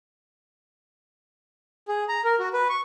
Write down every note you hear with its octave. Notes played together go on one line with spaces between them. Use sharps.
G#4
A#5
A#4
F#4
B4
C#6